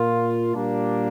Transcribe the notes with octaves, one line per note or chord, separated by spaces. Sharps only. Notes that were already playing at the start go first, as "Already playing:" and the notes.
Already playing: A#2 A#3 F4
A#2 G3 A#3 D4